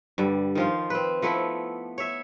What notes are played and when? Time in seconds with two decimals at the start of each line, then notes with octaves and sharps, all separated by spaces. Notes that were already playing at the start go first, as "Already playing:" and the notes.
0.18 G2 D3 G3
0.55 D#3 F3 F4
0.90 C4 B4
1.22 F3 A3 B3 E4
1.98 C#5 E5